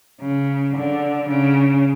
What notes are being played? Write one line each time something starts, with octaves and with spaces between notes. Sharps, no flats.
C#3
D3
C#3